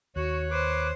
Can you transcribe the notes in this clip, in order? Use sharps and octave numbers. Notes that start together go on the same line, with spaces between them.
D#2 F#4 C#5 F#6
B4 C5 D6